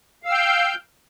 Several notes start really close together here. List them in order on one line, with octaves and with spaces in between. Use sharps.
F5 E6 F6 G5 G6